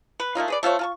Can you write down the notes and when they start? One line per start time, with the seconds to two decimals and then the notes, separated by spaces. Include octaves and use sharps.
0.20 B4
0.35 A3 A#3 D#4 F4
0.48 G#4 B4 D5
0.63 A3 F4 C5 C#5
0.79 F4 A5 C#6